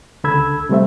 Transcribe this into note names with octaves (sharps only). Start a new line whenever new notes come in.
C#2 D3 A4 B5 E6 G#6
C3 G3 A3 C4 E5